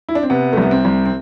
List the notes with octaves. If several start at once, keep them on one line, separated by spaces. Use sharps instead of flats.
E4
D4
C4
C3 B3
A3
C2 B3
C4
C2
C4